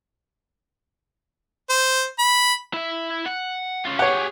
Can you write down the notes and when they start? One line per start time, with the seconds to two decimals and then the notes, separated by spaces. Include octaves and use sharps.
1.69 C5
2.19 B5
2.74 E4 E5
3.26 F#5
3.85 C#4 F4
3.99 G4 G#4 C#5 F#5